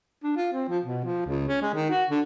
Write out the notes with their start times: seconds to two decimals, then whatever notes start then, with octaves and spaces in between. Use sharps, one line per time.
0.23 D4
0.36 F4
0.53 C4
0.69 F3
0.85 B2
1.04 F3
1.26 C#2
1.48 C#4
1.62 G#3
1.74 D#3
1.90 F#4
2.10 D3